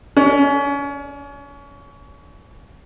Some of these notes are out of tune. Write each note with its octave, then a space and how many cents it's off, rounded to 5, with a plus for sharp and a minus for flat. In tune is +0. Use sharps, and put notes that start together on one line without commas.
C#4 +30 D5 +0